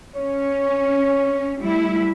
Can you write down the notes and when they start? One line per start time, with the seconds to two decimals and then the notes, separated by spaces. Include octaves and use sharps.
0.16 C#4 C#5
1.60 G3 A3 E4